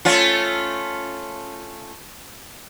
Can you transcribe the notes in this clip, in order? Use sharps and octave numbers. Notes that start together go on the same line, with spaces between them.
A3 C#4 F4